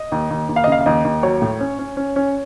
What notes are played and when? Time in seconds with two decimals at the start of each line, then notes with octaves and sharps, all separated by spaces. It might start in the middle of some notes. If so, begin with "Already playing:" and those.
Already playing: D#5
0.12 D#2
0.30 D#2
0.49 D#2
0.56 F5
0.64 D#5
0.67 C#3 F5
0.81 F5
0.86 D#2 D#5
1.05 D#2
1.23 F#3 C#5
1.42 A2
1.60 C#4
1.79 C#4
1.97 C#4
2.16 C#4